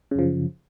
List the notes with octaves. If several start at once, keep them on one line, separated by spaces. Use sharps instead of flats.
F#2 C#3 F3